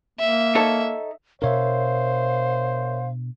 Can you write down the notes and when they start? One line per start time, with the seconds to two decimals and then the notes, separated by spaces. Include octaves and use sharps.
0.20 A#3 E5
0.55 D#4 A4 C#5
1.42 B2 D4 A#4 C5 C#5 E5 F5